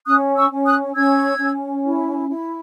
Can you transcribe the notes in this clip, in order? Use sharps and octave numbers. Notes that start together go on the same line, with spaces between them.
C#4 D#6 F#6
C#6 E6
C#4
D#6 F#6
C#4 E6 G#6
C#4
E4
E4